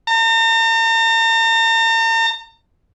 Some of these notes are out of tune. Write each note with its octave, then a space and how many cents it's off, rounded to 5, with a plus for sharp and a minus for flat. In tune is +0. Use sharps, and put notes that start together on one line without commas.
A#5 -45